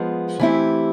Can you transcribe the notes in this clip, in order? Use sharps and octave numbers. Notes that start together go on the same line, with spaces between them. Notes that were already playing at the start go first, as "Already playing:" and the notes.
Already playing: F3 G#3 B3
E3 A3 C4 E4 G4